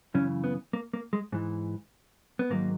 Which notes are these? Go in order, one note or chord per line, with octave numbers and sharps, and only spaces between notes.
F#2 C#3 E3 C#4
B3
A#3
A#3
G#3
G#2 E3
B3
G#2 D#3 F#3 A#3